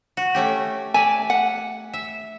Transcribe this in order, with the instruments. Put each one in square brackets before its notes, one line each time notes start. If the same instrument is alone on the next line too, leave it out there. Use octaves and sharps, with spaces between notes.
[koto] F#4
A3 C#4 G4
[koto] D5 E5 [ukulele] G#5
[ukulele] F#5
[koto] E5